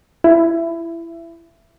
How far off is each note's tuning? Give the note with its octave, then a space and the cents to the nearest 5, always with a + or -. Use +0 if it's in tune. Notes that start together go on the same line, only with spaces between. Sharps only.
E4 +20